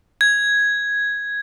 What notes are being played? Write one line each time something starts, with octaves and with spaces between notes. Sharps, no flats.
G#6